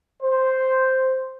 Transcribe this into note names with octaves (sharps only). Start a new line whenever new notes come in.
C5